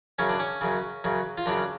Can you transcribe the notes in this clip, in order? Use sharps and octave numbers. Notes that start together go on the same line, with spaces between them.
F#2 C#3 C#4
D4
C#4
F#2 C#3
F#2 C#3
F4
F#2 C#3 D4